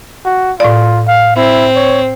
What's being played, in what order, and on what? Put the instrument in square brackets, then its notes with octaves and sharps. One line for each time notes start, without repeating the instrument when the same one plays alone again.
[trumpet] F#4
[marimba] A2 D5 [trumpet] F4
[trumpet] F5
[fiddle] C4 [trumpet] E4
[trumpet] C#5